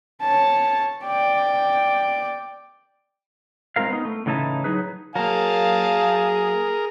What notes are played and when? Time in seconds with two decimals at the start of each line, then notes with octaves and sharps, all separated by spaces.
0.21 C#5 A5
1.04 D5 G5
3.76 G#3 C4 F4 A#4 F5
3.90 B3 D#4
4.05 A3
4.26 A2 C#3 E3 D#4 E4 A5
4.64 F#3 D#4 G#4 B4
5.16 F#3 A#3 G#4 A#4 F5 A5